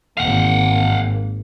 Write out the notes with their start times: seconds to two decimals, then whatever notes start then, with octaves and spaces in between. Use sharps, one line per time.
0.17 G#1 A#3 F5 F#5